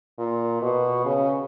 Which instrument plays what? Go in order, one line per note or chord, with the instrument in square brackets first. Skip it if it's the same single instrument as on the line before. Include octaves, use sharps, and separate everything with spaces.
[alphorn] A#2
B2
C#3